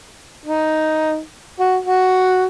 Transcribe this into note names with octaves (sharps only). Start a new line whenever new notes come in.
D#4
F#4
F#4